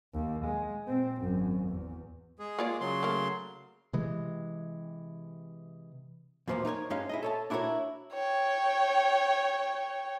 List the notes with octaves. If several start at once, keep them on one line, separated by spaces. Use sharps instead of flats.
D#2
G#3
A#2 C4
G#1 F#2
E2
G#3 G#4
A#3 F4 D5
C#3 F#3 C6
A3 A#3 A#4
C3 E3 G#3
E2 B2 F3 G#3 A#3
D#4 A#4 B4 C#5
G2 G#3 C#4 D#4 F5
E4 G#4 D#5
A4 C#5 A5
D4 E4 F#4 G4 A#4 C#5
C#5 G5